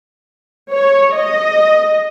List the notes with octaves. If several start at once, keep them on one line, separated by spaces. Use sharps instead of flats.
C#5
D#5